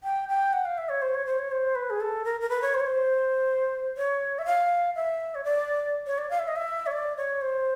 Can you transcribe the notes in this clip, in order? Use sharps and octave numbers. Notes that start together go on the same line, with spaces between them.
G5
G5
F#5
F5
E5
C#5
C5
C#5
C5
C#5
C5
B4
G#4
A4
A#4
A#4
B4
C#5
C5
C#5
C5
C#5
E5
F5
E5
C#5
D5
C#5
D5
F5
E5
D#5
E5
C#5
D5
C#5
C5